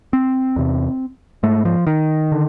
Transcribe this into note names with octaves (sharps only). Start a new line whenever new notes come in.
C4
E2 C3
G#2 A3
F3
D#3
D3